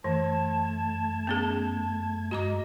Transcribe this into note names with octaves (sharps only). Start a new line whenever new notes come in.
F#2 E3 A3 A5 G#6
B3 C#4 G#4
G2 G#3 F#4 D#5 A#5 D6